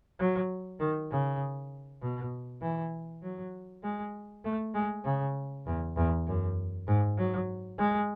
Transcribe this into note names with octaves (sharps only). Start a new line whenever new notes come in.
F#3
D#3
C#3
B2
E3
F#3
G#3
A3
G#3
C#3
E2
E2
F#2
G#2
F#3
G#3